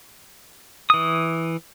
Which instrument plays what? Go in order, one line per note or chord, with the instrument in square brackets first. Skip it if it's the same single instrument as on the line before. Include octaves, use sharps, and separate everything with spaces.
[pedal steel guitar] E3 D#6